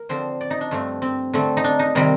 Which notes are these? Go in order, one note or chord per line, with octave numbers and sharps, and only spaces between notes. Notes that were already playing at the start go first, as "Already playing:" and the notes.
Already playing: A#4
D3 F3 C4 C5
D5
D#4
D4
G2 F3 A3 C4
C4
D3 A3 C4
D#4
D4
D#4
C3 D#3 G3 C4